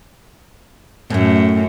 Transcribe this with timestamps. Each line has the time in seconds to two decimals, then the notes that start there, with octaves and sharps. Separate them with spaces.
1.10 F#2 A2 A3